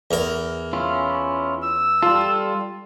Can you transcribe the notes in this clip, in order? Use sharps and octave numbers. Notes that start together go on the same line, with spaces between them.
E2 A#4
C#4 E4 F4
E6
G3 F4 A4